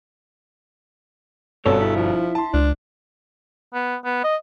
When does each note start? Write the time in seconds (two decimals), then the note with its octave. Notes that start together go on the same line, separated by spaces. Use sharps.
1.66 G1 G2 B2 C4 A4 C#5
1.81 E4
1.96 F3
2.35 A5 C6
2.53 C#2 D4
3.74 B3
4.05 B3
4.24 D#5